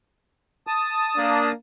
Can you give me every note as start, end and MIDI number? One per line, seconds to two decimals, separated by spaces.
0.67 1.52 81
0.67 1.52 87
1.17 1.51 58
1.17 1.51 62